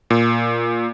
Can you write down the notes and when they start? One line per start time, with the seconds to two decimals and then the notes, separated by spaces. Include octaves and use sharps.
0.10 A#2